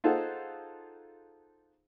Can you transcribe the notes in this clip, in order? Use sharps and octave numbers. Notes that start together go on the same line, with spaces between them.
D#4 F4 G#4 A4 C5 F#5